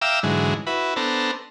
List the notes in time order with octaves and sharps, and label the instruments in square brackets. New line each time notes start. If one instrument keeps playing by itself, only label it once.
[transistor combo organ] E5 F5 G5 A#5 D6 E6
G#2 D3 E3 F#3 G#3
E4 F#4 B4
B3 D4 A4 C5 A#5